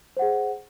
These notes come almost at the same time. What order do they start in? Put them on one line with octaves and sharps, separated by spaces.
C5 F#5 G#4